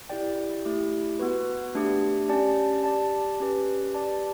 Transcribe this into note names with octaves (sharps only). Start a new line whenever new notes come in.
E4 G4 D5 G5
A3 E4 G4
B3 F#4 B4
A3 D4 G4
C#4 G4 D5 A5
G4 D5 A5
C#4 G4 B4
G4 D5 A5